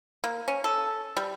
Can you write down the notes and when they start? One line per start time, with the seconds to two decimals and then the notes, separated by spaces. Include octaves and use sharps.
0.24 A#3
0.48 C#4
0.64 A4
1.17 G3